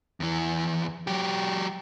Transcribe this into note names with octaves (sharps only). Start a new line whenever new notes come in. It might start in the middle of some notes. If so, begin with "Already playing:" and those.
E2 E3
F#3 G4